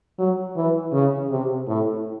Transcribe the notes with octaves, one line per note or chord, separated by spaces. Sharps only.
F#3
E3
C#3
C3
A2